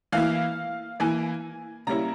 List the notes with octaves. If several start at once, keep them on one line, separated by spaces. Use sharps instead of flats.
E3 A#3 E4 F5
E3 A#3 E4 G#5
C#3 G3 A#3 C#4 E4 A#5